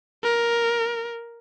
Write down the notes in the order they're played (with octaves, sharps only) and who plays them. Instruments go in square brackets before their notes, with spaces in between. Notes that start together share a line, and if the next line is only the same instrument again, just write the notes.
[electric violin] A#4